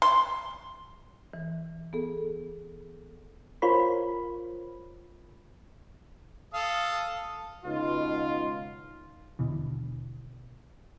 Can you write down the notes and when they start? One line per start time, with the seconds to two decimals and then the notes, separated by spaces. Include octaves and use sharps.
0.02 C6
1.33 E3
1.93 B3 G#4 A4
3.62 F4 A#4 C5 C#5 B5
6.54 A4 F5 D#6
7.65 C#2 B2 D#4 F4
9.39 D#2 B2 D3 E3